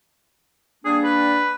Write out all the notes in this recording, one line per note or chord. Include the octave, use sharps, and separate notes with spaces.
G3 A#3 D4 G#4
B4